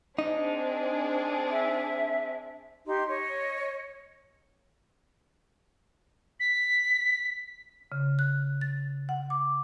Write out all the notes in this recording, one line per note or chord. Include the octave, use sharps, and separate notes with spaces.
C4 D4 D#4 G#4
E5
D#4 G4 C6
C#5 D#5
B6
C#3
F#6
A6
F#5
D6